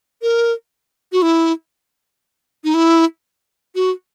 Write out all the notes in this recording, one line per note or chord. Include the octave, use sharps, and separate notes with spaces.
A#4
F#4
E4
D#4
E4
F#4